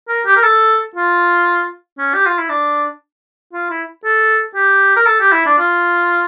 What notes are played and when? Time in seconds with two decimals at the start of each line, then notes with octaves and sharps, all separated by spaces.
0.09 A#4
0.26 G4
0.37 A#4
0.44 A4
0.95 F4
1.98 C#4
2.14 G4
2.26 F4
2.38 E4
2.49 D4
3.53 F4
3.70 E4
4.04 A4
4.55 G4
4.96 A#4
5.07 A4
5.20 G4
5.32 E4
5.46 D4
5.59 F4